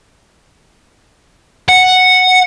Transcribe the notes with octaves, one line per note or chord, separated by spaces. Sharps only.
F#5